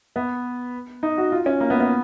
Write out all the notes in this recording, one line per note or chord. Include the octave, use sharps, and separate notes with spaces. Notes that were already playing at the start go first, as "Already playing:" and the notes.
B3
D#4
F#4
F4
C#4
A#3
B3
B3